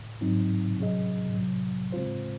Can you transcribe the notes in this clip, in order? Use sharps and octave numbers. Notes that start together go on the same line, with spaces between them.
G#2 F#3 C4 D#4
C3 F#3 C#4 G#4 D#5
C2 C3 F#3
C#3 G#3 C4 F4 C5